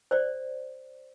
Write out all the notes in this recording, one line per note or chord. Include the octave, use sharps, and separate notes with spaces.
C5 D5